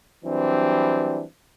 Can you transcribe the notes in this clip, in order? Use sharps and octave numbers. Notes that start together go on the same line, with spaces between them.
E3 F#3 G3 C4 D4